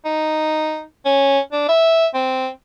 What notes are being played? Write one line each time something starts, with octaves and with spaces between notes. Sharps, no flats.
D#4
C#4
D4
E5
C4